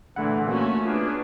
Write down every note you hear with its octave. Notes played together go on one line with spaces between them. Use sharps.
A#2 D3 E3 A3 E4 F#5
A3 A#3 C#4 F#4
A#3 B3 D4 F4 G#4 B4